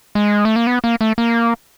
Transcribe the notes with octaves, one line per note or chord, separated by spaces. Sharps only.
G#3
A3
A#3
B3
A#3
A3
A#3